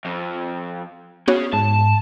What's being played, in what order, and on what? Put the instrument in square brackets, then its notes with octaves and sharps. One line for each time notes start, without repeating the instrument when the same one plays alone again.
[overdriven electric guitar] F2
[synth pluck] B3 F#4 C#5 [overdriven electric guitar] C#4 G#4
[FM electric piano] G#2 [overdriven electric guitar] A5